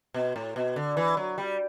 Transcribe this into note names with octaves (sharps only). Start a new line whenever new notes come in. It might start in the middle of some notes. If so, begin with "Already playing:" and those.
B2
A2
B2
D3
E3
F#3
G3